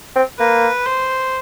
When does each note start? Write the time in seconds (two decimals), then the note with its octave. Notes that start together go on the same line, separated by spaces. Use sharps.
0.15 C4
0.39 A#3 B4
0.86 C5